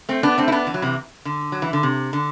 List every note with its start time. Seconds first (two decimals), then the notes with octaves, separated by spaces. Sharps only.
0.09 A3 C4
0.23 B3 D4
0.38 A3 C4
0.48 E4
0.52 B3 D4
0.67 E3
0.74 F#3
0.82 C3 E3
1.25 D3
1.52 F#3
1.62 E3
1.73 D3
1.83 C3
2.13 D3